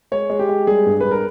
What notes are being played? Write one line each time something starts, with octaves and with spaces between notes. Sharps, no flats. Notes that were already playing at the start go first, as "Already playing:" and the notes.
G#3 C#5
G#3
G4
G#3
G3 G#4
G2
G2 B4
A#4